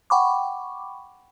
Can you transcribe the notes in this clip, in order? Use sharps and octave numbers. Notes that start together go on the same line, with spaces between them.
F#5 G5 B5 C#6 D6